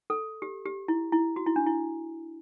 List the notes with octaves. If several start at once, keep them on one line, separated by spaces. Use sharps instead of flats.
A4
G4
G4
E4
E4
F#4
E4
D4
E4